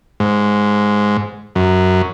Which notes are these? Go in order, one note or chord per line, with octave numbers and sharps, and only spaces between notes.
G#2
F#2